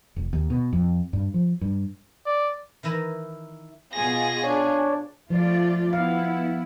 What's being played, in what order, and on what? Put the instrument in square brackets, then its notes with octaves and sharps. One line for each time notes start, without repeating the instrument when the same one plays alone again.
[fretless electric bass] F1
D#2
B2
F2
G2
F3
G2
[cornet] D5
[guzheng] D#3 E3 E4 A#5
[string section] B2 F4 G#4 [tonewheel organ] A#6
[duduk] D4 [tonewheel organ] C#5
[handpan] F3 [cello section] A3 F4 D5
[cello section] B3 E4 [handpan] F5